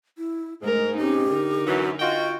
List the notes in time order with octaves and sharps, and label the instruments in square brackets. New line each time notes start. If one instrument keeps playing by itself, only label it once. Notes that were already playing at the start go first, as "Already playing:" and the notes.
[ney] E4
[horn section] G#2 [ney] G#3 [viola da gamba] A3 A#4
[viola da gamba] C4 C#4 D#4 [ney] G4
[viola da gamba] D3 D#4 A#4
[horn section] F#2 E3 F#3 [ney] F#4
[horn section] F4 F#4 G5 [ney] D#5